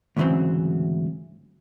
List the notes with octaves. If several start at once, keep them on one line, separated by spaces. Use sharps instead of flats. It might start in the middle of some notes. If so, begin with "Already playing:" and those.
D2 G#2 C#3 E3 F#3 C4